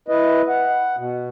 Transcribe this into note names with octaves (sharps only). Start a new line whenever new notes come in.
E4 B4 D#5
F#5
B2